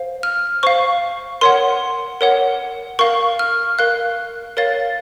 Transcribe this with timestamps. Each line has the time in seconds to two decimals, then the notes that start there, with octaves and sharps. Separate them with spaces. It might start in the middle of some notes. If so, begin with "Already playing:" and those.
Already playing: C5 F5
0.23 F6
0.63 C5 F5 C#6
1.41 A#4 C#5 F#5 C6
2.21 A#4 C#5 F#5
2.99 A#4 F5 C#6
3.39 F6
3.79 A#4 F5 F#6
4.57 A#4 C#5 F5 A6